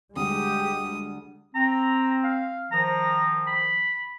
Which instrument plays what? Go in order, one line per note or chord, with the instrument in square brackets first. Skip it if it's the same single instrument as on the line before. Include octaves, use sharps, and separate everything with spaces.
[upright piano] D2 G3 [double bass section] G#3 [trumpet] G4 [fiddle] D#6
[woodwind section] C4 [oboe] A#5
[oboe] F5
[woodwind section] D#3 F3 [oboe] A#5
[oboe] B5